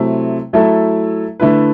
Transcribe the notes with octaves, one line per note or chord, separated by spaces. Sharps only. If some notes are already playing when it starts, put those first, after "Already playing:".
Already playing: C3 F#3 A3 C4 E4
F#3 A3 E4 A4
D3 A3 E4 B4